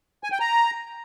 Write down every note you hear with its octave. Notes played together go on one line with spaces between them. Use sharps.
G#5
G5
A#5